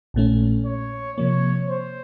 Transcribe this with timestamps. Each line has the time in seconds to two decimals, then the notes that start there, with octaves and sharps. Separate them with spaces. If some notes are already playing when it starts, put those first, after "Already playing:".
0.14 A#1 A#2 A3 C#4
0.66 C#5
1.17 C3 F3 A#3 C#5
1.69 C5